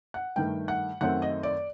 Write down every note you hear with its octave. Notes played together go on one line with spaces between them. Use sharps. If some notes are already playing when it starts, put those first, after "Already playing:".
F#5
G2 D#3 A3 G5
F#5
F#2 D#3 A3 C4 F#5
D#5
D5